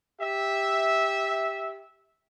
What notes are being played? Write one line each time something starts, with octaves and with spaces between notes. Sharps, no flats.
G4 E5